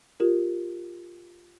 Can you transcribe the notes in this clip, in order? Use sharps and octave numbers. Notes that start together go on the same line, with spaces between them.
F4 G4 A#4